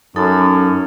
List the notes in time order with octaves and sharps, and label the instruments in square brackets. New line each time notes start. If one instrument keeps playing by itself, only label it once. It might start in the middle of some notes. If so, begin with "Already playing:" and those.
[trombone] F#2 [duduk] C#4 [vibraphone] D#4 A4 A5